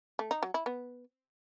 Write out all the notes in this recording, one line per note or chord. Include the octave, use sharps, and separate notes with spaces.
A3
D#4
F#3
E4
B3